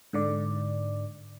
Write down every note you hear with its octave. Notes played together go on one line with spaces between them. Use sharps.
G#2 D3 D5